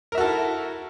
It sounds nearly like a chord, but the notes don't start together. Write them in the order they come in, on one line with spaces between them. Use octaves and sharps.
A#4 E5 F#4 A4 E4